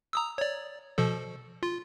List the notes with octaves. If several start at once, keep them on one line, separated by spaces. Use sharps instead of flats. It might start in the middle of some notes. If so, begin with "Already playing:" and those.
A#5 D#6 E6
C#5 D5
B2 F3 A4
F4